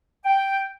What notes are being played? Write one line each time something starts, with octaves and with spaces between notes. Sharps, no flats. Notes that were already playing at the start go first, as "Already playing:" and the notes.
G5